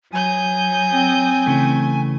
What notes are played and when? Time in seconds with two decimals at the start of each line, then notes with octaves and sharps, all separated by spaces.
0.13 F#3 G#5 D#6 G6
0.93 C4
1.46 C#3 E3 A3